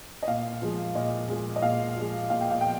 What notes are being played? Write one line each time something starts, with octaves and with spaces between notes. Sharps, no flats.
D#5
A#2 F5
F3 G#3
A#2 D#5
F3 G#3
D#5
A#2 F5
F3 G#3
A#2 F5
G5
F5
F3 G5